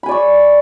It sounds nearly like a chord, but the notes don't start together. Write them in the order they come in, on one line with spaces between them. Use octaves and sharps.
B5 G#5 D5 C#6